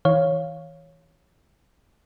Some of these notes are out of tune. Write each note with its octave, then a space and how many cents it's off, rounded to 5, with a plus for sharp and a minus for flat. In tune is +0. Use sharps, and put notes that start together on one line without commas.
E3 -30 C#5 +0 F5 +0